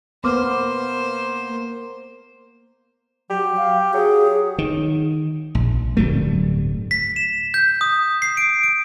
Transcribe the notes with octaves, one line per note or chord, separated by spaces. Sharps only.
A#3 B3 C5 C6 D6 F6
F#3 G4
F5
F#3 G#4
D#3
A#1
D1 G2 F#3 A3
B6
E7
G6
D#6
C7
D7
D7